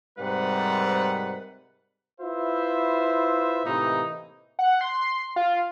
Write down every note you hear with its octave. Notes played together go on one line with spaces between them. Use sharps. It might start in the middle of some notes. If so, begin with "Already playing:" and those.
G#2 C3 G3 A#4 B4 F#5
E4 F4 B4 C5 E5
A2 C3 E3 A#3 D#4
F#5
C6
F4